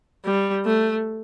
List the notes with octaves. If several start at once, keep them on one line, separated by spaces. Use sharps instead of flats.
G3
A3